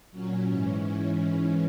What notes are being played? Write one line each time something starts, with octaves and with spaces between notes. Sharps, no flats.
A#2 F#3 C#4
G#2 E3